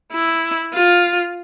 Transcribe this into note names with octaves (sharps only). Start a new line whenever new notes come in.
E4
F4